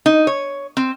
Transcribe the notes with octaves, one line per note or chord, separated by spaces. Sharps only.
D#4
C#5
C4